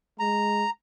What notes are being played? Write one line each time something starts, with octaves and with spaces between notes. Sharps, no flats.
G#3 A#5